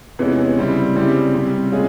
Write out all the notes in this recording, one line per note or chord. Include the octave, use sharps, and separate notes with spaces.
E2 C3 E3 G#3 C#4
C#3 G3 C4 E4
C#3 G3 C4 E4 G4
C3 G3 C4
A#2 G#3 C#4 F4 G#4